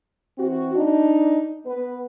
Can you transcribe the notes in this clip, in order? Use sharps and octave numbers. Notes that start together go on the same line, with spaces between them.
E3 C4 F#4
D4 D#4
B3 B4